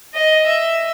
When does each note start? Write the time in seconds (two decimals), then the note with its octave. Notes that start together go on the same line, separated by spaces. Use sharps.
0.14 D#5
0.46 E5